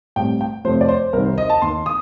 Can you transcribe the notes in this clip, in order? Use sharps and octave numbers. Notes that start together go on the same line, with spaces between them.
A2 G3 C4 G5
G5
F2 C3 F3 A3 C5
D5
C5
C2 C3 D#3 A#4
C5
D#5
A5
D#2 D#3 A#3 C6
D#6